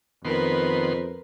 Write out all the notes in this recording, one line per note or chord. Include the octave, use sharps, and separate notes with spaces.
F2 D#3 B3 A#4 B4 C6